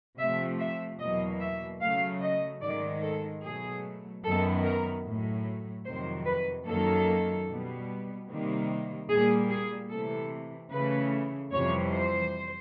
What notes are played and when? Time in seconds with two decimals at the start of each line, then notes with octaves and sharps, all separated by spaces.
0.18 C3 F3 A3 E5
0.59 E5
0.99 E2 B2 F#3 A#3 D#5
1.40 E5
1.80 C#3 F#3 A3 F5
2.21 D#5
2.61 G#2 D#3 G#3 D5
3.02 A4
3.42 B2 F#3 A3 G#4
4.23 F#2 D#3 F#3 B3 A4
4.63 A#4
5.04 A2 F#3 A3
5.85 F2 C3 D#3 F#3 C5
6.25 B4
6.65 F#2 D#3 F#3 A#3 A4
7.47 B2 G3 B3
8.27 C3 D#3 G3 A#3
9.08 A#2 G3 A#3 G#4
9.49 G#4
9.89 C3 E3 A3 A4
10.69 C#3 E3 A3 B4
11.51 F2 C3 E3 G3 C#5
11.91 C5